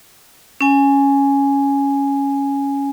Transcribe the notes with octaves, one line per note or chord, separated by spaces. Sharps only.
C#4 G#5